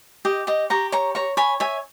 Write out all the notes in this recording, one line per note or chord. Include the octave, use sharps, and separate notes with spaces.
G4 D#5
G4 D#5
G4 A#5 C#6
C#5 A#5 C#6
C#5 A#5 C#6
C#5 G#5 B5
C#5 E5 G#5